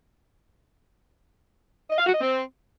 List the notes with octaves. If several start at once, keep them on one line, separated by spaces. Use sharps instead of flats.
D#5
F5
F#4
D#5
C4